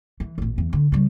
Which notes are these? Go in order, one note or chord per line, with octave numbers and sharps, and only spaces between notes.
E3
A1 A#2
E2
D3
C#3 G3